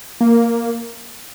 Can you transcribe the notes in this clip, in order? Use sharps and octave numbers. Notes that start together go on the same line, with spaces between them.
A#3